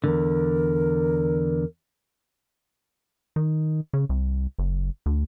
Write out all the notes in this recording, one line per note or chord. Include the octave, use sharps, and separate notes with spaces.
E2 G2 D3 A#4
D#3
C#3
C2
F#1
D2